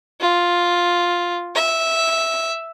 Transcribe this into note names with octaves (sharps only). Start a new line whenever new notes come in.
F4
E5